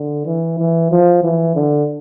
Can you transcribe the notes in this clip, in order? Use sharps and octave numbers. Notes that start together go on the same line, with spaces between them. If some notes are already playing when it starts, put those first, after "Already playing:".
Already playing: D3
E3
E3
F3
E3
D3